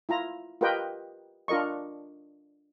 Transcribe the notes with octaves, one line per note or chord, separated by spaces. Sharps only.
E4 F4 A#5
F4 G4 A#4 B4 D#5 G5
D4 F4 A#4 D#5 C#6